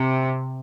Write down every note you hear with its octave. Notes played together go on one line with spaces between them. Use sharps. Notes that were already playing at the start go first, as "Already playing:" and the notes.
Already playing: C3